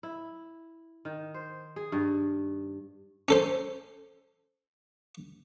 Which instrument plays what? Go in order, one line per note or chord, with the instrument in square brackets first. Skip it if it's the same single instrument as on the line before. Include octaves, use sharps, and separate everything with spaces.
[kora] E4
D#3
C5
G#4
G2
[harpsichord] C#4 A4 C5